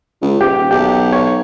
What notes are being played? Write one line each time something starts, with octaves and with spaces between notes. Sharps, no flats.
C#2
D#1 G4
B1 G4
C#5